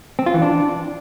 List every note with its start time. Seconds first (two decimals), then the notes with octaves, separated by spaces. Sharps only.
0.19 C4
0.26 F4
0.34 E3
0.42 D4